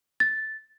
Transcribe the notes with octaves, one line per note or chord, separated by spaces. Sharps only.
A6